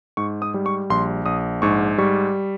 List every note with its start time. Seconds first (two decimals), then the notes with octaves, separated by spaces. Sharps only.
0.17 G#2 C#6
0.42 D#6
0.54 G3
0.66 C#6
0.90 A#1 C6
1.26 A#1 D#6
1.62 G#2 C#6
1.98 G3 C#6